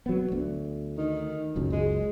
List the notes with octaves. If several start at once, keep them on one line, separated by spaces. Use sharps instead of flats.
F#3 B3
D2
D#3
F#1 C#2 F#2
G#3